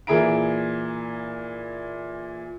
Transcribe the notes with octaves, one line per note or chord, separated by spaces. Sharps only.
A#2 E3 G#4 E5 A#5 D7